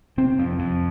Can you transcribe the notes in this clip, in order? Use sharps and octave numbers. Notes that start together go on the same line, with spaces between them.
C3 C4
F2
F2